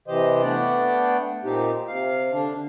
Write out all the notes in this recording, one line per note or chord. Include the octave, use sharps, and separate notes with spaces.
C3 E3 G4 C5 D#5
A3 B3 D4 D5 F#5 G5
A#2 C4 D#4 G4
C3 F5
D3 D4